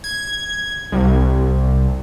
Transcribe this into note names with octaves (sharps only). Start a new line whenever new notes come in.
G#6
C2